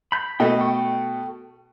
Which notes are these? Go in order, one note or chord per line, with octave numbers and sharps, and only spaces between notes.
B5 G6
B2 A3 A4 D#5 G5
A4 G5 C#6